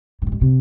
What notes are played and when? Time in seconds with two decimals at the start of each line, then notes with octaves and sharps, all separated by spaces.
0.22 G#2
0.27 A2
0.32 G#2
0.41 C3